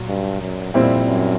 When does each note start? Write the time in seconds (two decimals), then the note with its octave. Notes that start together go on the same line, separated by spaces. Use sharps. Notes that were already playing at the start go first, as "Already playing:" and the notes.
Already playing: A#2 F#3
0.09 G2
0.41 F#2
0.74 F2 A#2 G3 C4 E4 G4
1.07 F#2